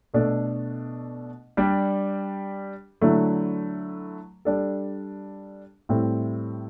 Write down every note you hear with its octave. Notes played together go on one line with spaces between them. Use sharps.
B2 A3 D4 A4
G3 D4 G4
D3 F#3 A3 E4
G3 D4 A4
A2 G3 C4 E4 A4